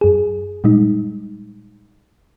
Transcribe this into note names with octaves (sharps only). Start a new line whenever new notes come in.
F#2 G#4
A#2 G3 G#3 D#4